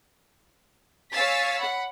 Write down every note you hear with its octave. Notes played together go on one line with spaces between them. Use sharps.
C#5 F5 G#5 E6 A6 B6
F#5 B5